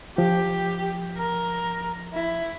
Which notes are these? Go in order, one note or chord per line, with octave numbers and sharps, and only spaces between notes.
F3 G4
A#4
E4